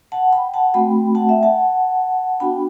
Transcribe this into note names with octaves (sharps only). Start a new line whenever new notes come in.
F#5 A5
G5 B5
F#5 A5
A3 C4 F#4 G5 B5
F#5 A5
E5 G5
F#5 A5
B3 D4 F#4 G5 B5